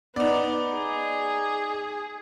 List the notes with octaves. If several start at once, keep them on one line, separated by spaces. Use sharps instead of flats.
B3 D#4 D5
G#4